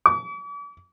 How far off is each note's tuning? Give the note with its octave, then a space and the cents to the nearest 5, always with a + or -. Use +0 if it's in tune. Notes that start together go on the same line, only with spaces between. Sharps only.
D6 -45